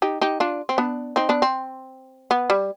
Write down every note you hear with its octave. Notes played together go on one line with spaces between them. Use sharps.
D#4 G4
D#4 G4
D4 F4
C4
B3 D4
C4 D#4
B3 D4
C4
B3
G3